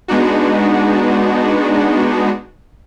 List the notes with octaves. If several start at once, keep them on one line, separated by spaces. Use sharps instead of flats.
G#3 B3 D4 D#4 F#4